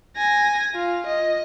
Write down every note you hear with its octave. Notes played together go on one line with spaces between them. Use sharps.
G#5 A#6
F4
D#5